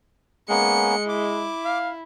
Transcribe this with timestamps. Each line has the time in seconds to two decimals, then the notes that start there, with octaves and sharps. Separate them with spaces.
0.49 G#3 A#3 B3 C#4 C#7
1.09 E4 D6
1.65 F5